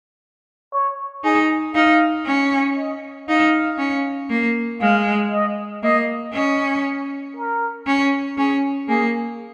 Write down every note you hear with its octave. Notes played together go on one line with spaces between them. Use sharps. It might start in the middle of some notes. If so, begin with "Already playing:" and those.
C#5
D#4 G#4
D#4 F5
C#4
D#5
D#4 F5
C#4
A#3
G#3 F5
D#5
A#3 D#5
C#4 D#5
A#4
C#4
C#4 G#4
A#3 G#4